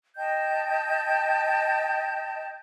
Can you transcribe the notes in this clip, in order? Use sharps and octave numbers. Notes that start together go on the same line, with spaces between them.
D#5 G5 A5 G6